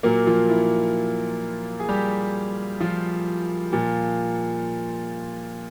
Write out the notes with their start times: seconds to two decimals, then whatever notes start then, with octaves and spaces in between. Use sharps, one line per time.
0.03 A#2 F#3 A#3 A#4
0.27 F3 F4
0.50 E4
1.80 G#4
1.89 G3 G4
2.80 F3 F4
3.73 A#2 F3